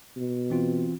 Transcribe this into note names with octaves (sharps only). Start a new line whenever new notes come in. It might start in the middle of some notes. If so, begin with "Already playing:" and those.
B2
E3 C4 F4